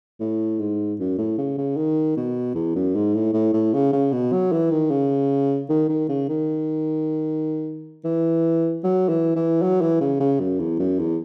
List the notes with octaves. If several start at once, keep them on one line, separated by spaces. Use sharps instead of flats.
A2
G#2
F#2
A2
C#3
C#3
D#3
B2
E2
F#2
G#2
A2
A2
A2
C#3
C#3
B2
F#3
E3
D#3
C#3
D#3
D#3
C#3
D#3
E3
F#3
E3
E3
F#3
E3
C#3
C#3
F#2
E2
F#2
E2